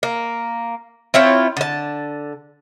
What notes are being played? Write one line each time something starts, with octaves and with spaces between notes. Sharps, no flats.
A#3
C4 E4 F4 C#5
D3 A5